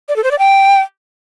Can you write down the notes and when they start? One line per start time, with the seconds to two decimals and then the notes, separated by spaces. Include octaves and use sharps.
0.08 D5
0.16 A4
0.24 C5
0.31 D5
0.39 G5